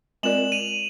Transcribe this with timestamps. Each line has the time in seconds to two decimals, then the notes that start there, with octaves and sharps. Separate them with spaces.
0.23 G#3 C4 F4 A#4 D5 E7 F#7
0.52 D#7 F7